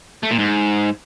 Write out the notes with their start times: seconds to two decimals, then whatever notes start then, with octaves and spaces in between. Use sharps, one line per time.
0.23 A3
0.31 A#2
0.39 G#2